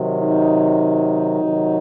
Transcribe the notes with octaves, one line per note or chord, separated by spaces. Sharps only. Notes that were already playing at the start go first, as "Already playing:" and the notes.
Already playing: C3 D#3 F#3
D#4
C3 D#3 F#3